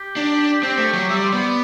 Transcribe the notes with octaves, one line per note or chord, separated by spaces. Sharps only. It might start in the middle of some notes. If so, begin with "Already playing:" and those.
Already playing: G4
D4
C4 G4
A3
F#3
G3 E5
D5
C5
B3 D5